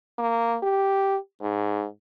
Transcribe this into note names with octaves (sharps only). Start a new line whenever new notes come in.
A#3
G4
G#2